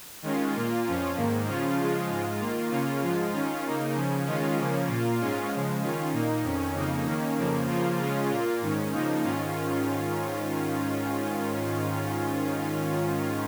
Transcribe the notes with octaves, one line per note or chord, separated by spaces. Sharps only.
D#3 G#3 C#4 F4
A#2 A#3 F4
F2 F3 C#4 F4
G#2 D#3 A#3
C#3 F3 C#4 F4
C#3 F3 G#3 F4
G#2 G#3 F4
D#3 A#3 F4
C#3 A#3 C#4 F4
G#2 F3 G#3 F4
D#3 C#4 F4
C#3 A#3 D#4
C#3 F3 C#4
D#3 G#3 C#4 F4
C#3 F3 A#3 C#4
A#2 A#3 F4
G#2 G#3 C#4 F4
C#3 F3 G#3
D#3 C#4 F4
A#2 A#3 D#4
F2 D#3 C#4
F2 C#3 A#3 D#4
D#3 A#3 C#4
F2 C#3 F3 A#3
C#3 F3 A#3 F4
C#3 G#3 C#4 F4
A#2 A#3 F4
G#2 D#3 C#4
C#3 F3 A#3 D#4
G#2 D#3 C#4 F4